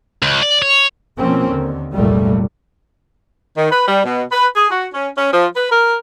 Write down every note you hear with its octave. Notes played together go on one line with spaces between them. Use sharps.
C#2
D5
C#5
B2 F3 A#3 C4 C#4
D#2 D3
F1 C#2 A#2 F#3 G3 A3
D#3
B4
G3
B2
B4
G#4
F#4
C#4
C#4
F3
B4
A#4